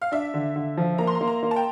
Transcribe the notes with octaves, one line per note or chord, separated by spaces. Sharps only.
F5
D4 E5
D3
D3
F3
A#3 A#5
C6
A#5
A#3
A#5
A#3
A5
G5